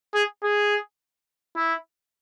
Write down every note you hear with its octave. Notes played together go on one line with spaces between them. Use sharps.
G#4
G#4
E4